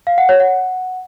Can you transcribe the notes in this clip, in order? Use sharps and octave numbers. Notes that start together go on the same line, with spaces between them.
F5
F#5
C#5
F#5